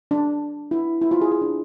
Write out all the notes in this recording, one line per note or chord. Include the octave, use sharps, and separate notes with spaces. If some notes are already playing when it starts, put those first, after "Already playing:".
D4
E4
E4
F4
G#4
G#4
D4